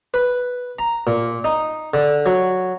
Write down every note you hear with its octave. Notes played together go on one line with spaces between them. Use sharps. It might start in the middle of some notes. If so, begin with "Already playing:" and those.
B4
A#5
A#2
D#4
D3
F#3